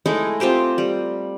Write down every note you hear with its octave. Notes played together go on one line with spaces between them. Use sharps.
G#3 A3 D#4 E4
C4 F4 G4 C5
G3